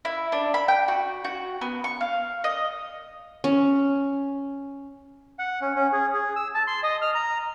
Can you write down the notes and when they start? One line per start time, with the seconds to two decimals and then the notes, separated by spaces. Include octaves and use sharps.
0.05 E4
0.32 D4
0.54 B5
0.68 G5
0.88 F#4
1.24 F#4
1.61 B3
1.84 C#6
2.01 F5
2.44 D#5
3.44 C#4
5.39 F#5
5.61 C#4
5.76 C#4
5.92 G#4
6.14 G#4
6.36 E6
6.55 A5
6.67 C6
6.83 D#5
7.02 F6
7.15 A#5